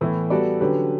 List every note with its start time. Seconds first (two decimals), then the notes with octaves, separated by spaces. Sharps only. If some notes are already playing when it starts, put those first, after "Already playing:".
0.01 A2 E3 B3
0.30 G3 B3 F#4 A4 D5
0.60 D3 F#3 C#4 G4 B4